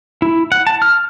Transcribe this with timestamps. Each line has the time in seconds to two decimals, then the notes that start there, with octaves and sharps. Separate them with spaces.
0.22 E4
0.52 F#5
0.67 A5
0.82 F6